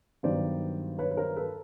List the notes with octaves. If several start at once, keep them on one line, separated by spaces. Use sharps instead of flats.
G2 D#3 F#3 B3 C5 D5
B4 C#5
B4
A#4 C5
A4 B4